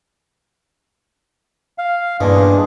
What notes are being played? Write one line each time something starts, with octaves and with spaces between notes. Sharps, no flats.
F5
E2 G2 A#2 C#3 D4 G#4 D#5